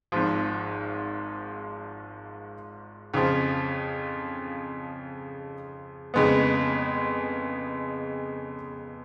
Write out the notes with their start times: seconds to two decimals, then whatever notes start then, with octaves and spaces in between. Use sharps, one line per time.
0.12 G#1 G#2 F3
3.14 F2 C#3 F3
6.14 F2 C#3 G#3 B3